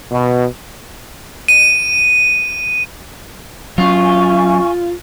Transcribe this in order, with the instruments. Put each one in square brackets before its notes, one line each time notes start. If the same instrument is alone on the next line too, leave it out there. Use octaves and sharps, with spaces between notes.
[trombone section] B2
[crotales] D#7
[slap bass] F#3 C#4 [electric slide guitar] F4 [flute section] G#5 C#6